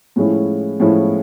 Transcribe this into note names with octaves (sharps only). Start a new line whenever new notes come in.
A2 F3 G#3 C#4 E4
A2 F3 G#3 C#4 E4